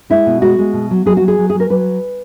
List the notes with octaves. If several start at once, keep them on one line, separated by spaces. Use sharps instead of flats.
G#3 E4
B2
G#3 F#4
G#3
B2
F#3
F#3 G#4
F#3 F#4
G#4
F#3
G#4
F#3
A#4
F#3 B4